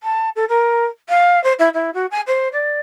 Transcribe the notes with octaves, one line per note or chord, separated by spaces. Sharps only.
A5
A4
A#4
F5
C5
E4
E4
F#4
G#5
C5
D5